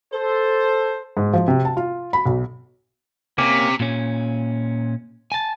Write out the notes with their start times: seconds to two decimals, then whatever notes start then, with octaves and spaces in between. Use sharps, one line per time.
0.13 A4 C5
1.17 G#2
1.33 F3
1.48 C3
1.65 A5
1.77 F4
2.13 B5
2.26 B1
3.38 C3 A#3 C#4 D6
3.80 A#2 C#4
5.32 G#5 A5